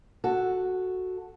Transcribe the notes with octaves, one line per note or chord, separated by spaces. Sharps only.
F#4 A4